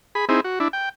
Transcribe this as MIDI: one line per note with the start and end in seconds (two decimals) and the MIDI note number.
0.15 0.25 68
0.15 0.25 83
0.29 0.40 60
0.29 0.40 63
0.29 0.40 64
0.29 0.40 68
0.44 0.59 66
0.60 0.68 62
0.60 0.68 64
0.73 0.89 79